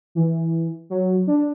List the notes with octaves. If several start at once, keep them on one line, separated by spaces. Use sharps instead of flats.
E3
F#3
D4